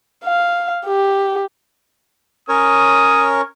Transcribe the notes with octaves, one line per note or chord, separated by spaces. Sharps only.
F5
G4
C#4 A#4 C#5 D#6